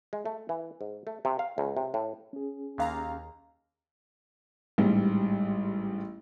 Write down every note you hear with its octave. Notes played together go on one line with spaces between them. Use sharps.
G#3
A3
E3
G#2
A3
C3
F5
C#2
C3
A2
C#4 G#4
D#2 F5 A#5
A1 G#2 G3